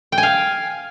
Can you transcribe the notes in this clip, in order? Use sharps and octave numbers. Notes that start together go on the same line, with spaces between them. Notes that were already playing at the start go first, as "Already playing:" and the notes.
G5
G#5
F5